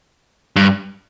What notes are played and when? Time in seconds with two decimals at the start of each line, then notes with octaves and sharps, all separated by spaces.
0.56 G2